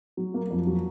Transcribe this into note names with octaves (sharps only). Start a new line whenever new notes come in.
F#3
A#3
F2
F#3